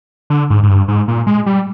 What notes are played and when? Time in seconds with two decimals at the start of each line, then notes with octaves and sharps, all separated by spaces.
0.30 D3
0.50 G#2
0.63 G#2
0.69 G2
0.88 G#2
1.08 A#2
1.27 G#3
1.46 G3